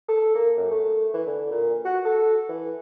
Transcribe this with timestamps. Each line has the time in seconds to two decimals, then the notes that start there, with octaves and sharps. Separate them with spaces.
0.08 A4
0.35 A#3
0.57 F#2
0.71 A3
1.13 E3
1.26 D3
1.51 A#2
1.85 F#4
2.05 A4
2.49 E3